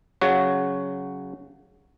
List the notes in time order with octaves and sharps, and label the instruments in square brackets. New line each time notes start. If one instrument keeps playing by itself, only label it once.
[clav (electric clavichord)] C#3 F#3 F#4